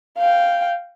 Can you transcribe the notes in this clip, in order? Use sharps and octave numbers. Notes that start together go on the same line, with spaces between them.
F5 G5